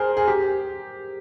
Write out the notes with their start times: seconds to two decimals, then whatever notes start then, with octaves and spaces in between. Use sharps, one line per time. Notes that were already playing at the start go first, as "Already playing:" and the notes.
Already playing: G#4 A#4 C5
0.17 G#4
0.28 G4